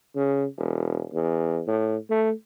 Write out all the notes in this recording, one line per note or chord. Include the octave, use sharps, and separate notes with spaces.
C#3
E1
E2
A2
A3